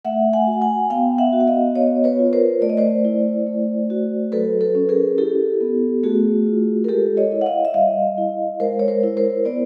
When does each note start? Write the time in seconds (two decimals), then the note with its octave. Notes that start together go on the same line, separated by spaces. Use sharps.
0.05 A3 E5 F#5
0.33 F#5 G#5
0.47 F#4
0.61 F#5 G#5
0.90 B3 F5 G5
1.18 E5 F#5
1.33 F#4
1.40 F#5
1.47 D#5 F5
1.75 B3 C#5 D#5
2.04 B4 C#5
2.19 F4
2.33 A#4 C5
2.61 A3 D5
2.69 D#5
2.77 C5 D5
3.05 E4
3.47 A3
3.90 F#4
4.32 F#3 A4 B4
4.61 A4 B4
4.75 C#4
4.89 G#4 A#4
5.18 E4 G4 A4
5.61 B3
6.03 A3 F#4 G#4
6.46 F4
6.84 A#4
6.88 G#3 G4 A4
7.17 C#5 D#5
7.32 E4
7.41 F#5
7.46 D#5 F5
7.65 E5
7.74 G3 D#5 F5
8.18 E4
8.60 G#3 A#4 C5
8.79 C#5
8.88 A#4 C5
9.03 E4
9.17 A#4 C5
9.45 B3 C5 D5